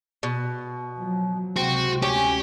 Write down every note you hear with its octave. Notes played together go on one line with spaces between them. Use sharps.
B2
F3 F#3
C#2 C3 G#3 C4 F#4
D2 C#4 G4